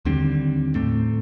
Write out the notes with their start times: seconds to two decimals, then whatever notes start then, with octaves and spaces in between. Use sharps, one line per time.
0.05 D#2 D3 G3 C4
0.75 A2 A3 C4